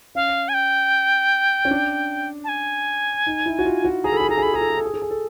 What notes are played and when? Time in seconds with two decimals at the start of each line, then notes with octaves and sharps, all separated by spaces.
0.15 C#4 F5
0.49 G#5
0.54 G5
1.65 C#4
1.71 D4
2.44 A5
2.48 G#5
3.26 D#4
3.46 E4
3.59 F#4
3.65 F4
3.84 F#4
4.04 G#4 A#5
4.12 A4
4.17 G#4 B5
4.29 A4 A#5
4.37 G#4
4.42 A4 B5
4.53 G#4 A#5
4.61 A4
4.70 G#4
4.77 A4
4.85 G#4
4.94 A4
5.02 G#4
5.10 A4